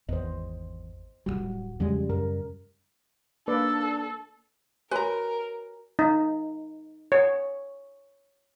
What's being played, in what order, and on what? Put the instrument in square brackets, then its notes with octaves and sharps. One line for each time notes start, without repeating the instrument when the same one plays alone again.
[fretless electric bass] G#1 E2 [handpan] C5 D#5
[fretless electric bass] D1 A#1 G3 [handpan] F#4
[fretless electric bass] E2 F3 G#3 [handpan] C#3 G3
[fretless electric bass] F#2 [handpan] A#4
[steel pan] A#3 B4 D5 [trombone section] D4 [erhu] A4
[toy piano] F#4 C#5 G#5 [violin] A#4 [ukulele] B4 A#5
[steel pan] D#4
C#5